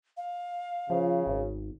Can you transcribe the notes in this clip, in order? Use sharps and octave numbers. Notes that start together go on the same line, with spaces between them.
F5
C#3 F3
G#1